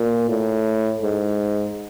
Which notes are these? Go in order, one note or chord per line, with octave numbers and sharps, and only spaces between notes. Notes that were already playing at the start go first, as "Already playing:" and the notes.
Already playing: A#2
A2
G#2